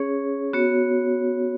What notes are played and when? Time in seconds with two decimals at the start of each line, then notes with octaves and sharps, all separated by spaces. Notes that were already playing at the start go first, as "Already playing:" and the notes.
Already playing: C#4 G#4 C#5
0.53 B3 F#4 C#5